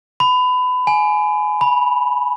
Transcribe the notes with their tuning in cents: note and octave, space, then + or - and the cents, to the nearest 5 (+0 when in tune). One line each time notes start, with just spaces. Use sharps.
B5 +25
G#5 +20
B5 -10